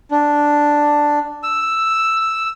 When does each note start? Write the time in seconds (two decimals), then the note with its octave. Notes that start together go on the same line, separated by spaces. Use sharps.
0.11 D4
1.43 E6